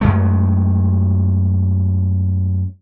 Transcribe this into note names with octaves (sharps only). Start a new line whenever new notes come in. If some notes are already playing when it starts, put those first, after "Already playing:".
F#2 G#3 A3